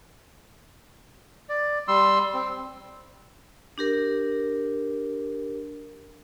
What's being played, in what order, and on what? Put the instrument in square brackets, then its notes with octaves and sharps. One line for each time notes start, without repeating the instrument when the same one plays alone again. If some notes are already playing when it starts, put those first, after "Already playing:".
[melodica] D5
G3 C6 E6
C4
[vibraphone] D4 G4 A#4